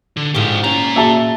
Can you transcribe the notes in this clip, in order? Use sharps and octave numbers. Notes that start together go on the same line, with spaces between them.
D3
G#2 D3 F3 E4 G4
A#2 C#4 A#5
A#3 F#4 G#4 E5 A5